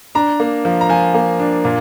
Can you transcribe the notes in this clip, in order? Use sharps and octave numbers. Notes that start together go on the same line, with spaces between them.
D4 A#5
A#3
F3
A#5
F3 G#5
A#3
D4
A#2